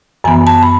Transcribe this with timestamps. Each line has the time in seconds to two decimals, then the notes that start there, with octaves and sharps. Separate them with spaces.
0.24 F#2 E3 B3 G#5
0.47 A5
0.63 B5